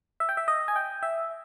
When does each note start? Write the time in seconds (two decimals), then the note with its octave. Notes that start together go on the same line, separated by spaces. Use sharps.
0.20 E5
0.29 G5
0.37 E5
0.48 D#5
0.68 G#5
0.76 G5
1.03 E5